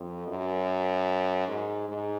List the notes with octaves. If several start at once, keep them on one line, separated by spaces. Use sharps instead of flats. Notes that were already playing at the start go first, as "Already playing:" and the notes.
Already playing: F2
F#2
G#2
G#2